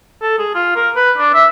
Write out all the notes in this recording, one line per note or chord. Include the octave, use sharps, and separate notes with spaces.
A4
G#4
F4
A#4
B4
D4
E5